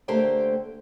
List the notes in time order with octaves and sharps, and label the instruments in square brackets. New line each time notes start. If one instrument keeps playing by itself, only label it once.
[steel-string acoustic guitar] D3 A3 A#3 G4 C5 G5